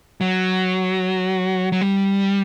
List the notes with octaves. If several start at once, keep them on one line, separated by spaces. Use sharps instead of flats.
F#3
F#3
G3